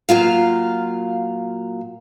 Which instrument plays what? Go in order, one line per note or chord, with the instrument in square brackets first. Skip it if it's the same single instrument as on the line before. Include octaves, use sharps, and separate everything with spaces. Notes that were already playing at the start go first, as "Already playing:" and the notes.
[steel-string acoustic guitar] A#2 F#3 F4 F5